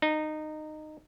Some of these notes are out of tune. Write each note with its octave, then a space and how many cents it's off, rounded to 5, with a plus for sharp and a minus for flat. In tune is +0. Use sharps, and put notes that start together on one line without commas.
D#4 -15